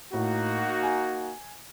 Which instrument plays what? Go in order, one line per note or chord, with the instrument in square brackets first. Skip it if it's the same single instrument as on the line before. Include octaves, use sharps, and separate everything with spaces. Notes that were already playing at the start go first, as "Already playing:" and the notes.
[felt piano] A2 [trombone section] A#3 D#4 F#4
[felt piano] G#5